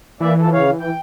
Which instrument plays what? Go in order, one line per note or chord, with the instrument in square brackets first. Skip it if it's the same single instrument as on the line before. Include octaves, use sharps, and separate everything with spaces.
[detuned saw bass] E3 [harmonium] A#3 D5 E5
[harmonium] F3 A4
C#3 C#5 F5
G5